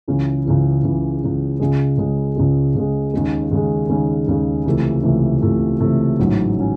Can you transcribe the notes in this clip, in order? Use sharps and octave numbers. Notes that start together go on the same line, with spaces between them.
C#2 C#3 E3
C#2 C#3 E3
C#2 C#3 E3
C#2 C#3 E3
C#2 C#3 G#3
C#2 C#3 G#3
C#2 C#3 G#3
C#2 C#3 G#3
D#2 C#3 G#3
D#2 C#3 G#3
D#2 C#3 G#3
D#2 C#3 G#3
C#2 C3 E3 A3
C#2 C3 E3 A3
C#2 C3 E3 A3
C#2 C3 E3 A3
A1 G#2 F#3 C#4
F#3 C#4